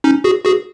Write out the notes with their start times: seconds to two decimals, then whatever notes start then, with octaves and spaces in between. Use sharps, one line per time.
0.04 C#4 D#4
0.24 F#4 G#4
0.45 F#4 G#4